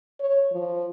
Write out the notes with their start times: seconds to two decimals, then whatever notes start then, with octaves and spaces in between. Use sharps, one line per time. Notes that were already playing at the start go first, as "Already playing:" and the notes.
0.20 C#5
0.51 F3